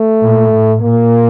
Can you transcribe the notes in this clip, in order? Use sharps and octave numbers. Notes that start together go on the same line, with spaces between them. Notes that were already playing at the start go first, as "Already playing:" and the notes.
Already playing: A3
A#2
A2
A#2 A#3